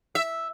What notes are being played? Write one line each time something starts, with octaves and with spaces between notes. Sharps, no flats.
E5